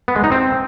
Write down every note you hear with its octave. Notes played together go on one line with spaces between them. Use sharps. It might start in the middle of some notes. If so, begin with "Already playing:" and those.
B3
G#3
D#4
C4